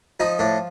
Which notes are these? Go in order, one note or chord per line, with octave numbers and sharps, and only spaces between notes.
F3 D#4
A2 D4